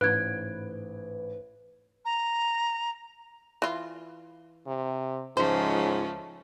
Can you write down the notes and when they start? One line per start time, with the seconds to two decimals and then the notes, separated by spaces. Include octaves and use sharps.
0.01 A1 G#2 B4 F#6 G#6 D7
2.05 A#5
3.62 E3 F4
4.67 C3
5.37 C#2 G#2 F3 A3 C#4 C5